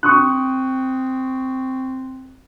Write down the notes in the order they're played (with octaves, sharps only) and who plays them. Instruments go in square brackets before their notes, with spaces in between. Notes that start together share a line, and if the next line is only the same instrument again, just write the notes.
[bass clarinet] C4 [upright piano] C#6 D#6 F#6